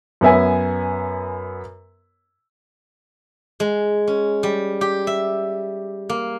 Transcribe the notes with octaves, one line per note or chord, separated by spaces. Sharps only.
F#2 B3 E5 G#5
G#3
C#4
G3
G4
E5
A#3